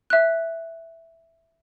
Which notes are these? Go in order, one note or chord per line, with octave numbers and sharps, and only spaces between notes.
E5 F#6